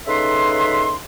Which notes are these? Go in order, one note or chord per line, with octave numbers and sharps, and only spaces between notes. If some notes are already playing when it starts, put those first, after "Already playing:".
C#3 D#4 A4 B4 E5 C6